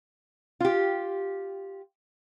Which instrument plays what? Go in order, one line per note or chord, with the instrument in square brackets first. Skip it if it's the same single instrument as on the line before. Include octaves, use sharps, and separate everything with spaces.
[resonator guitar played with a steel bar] F4 G4